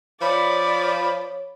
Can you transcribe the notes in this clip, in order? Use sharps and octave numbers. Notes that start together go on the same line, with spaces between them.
F3 C#5 D5 B5